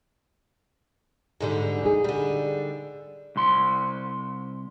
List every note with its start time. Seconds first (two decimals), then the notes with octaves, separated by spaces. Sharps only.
1.41 G#2 D3 G3
1.82 D#4 G#4
2.04 D3 G3
3.36 C2 C6